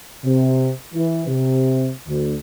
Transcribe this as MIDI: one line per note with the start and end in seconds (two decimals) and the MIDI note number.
0.24 0.70 48
0.94 1.25 52
1.27 1.90 48
2.07 2.35 38